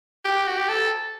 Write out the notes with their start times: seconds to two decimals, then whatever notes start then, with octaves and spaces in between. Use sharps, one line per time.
0.25 G4
0.47 F#4
0.58 G4
0.69 A4